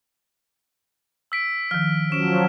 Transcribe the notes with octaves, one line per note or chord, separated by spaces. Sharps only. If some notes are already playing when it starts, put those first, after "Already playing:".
E6 B6 D7
D#3 F3 F6
F3 F#3 C#4 D7 E7